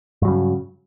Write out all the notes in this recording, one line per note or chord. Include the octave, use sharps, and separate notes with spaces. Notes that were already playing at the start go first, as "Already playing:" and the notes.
G2 C#3 F#3